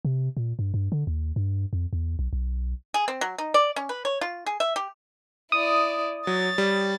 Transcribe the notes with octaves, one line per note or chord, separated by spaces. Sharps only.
C3
A#2
G2
G2
D3
D#2
G2
F2
E2
B1
B1
G#4
C4
F#3
D#4
D5
C#4
B4
C#5
F4
G#4
E5
G4
E4 D5 D#6
F#3 C#5 A6
G3